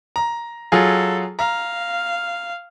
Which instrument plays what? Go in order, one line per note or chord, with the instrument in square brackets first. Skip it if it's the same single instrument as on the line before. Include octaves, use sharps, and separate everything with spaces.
[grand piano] A#5
[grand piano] F#3 F4 G#4 [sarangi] A4
[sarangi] F5 [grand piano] A#5